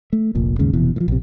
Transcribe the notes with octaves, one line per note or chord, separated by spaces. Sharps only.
A3
F1 A#1 A#2
D#2 G#2 C#3
F1 B2 E3
A2 F3
A#1 C3